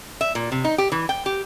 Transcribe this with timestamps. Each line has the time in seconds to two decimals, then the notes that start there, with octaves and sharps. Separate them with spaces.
0.21 E5
0.35 A#2
0.52 C3
0.64 D#4
0.78 G4
0.92 E3
1.09 G5
1.26 G4